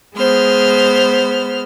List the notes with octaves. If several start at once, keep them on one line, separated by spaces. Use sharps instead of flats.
G#3 B3 C5 F6